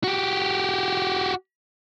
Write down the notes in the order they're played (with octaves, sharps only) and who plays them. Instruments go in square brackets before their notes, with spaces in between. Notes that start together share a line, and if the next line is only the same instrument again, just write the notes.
[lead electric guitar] F#4 G4